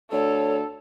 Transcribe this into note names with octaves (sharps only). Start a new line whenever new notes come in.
D2 A4 C#5